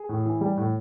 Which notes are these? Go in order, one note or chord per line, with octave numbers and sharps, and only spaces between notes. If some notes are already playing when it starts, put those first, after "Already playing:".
Already playing: G#4
A2
E3
G3
A2